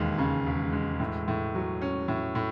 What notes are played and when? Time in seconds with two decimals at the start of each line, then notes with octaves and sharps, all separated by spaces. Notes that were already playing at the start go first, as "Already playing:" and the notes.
Already playing: E1 D#2 G#3
0.18 C#3
0.46 E1
0.73 G#3
1.00 A2
1.28 A2
1.55 F#3
1.82 C#4
2.08 A2
2.35 A2